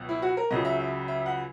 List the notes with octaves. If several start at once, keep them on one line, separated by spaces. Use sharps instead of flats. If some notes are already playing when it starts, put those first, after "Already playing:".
Already playing: C#2 B2 F#3
E4
F#4
A#4
C#2 C#3 F#3 D#5
E5
E5
E5
F#5